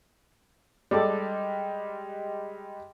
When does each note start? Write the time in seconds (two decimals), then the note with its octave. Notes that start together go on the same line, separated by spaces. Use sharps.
0.91 G3 G#3 A4 D5